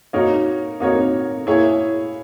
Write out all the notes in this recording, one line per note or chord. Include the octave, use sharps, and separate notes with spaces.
A#3 D#4 F#4 A#4 C#5
A#3 D#4 F#4 A#4 C#5
A#3 E4 G#4 C#5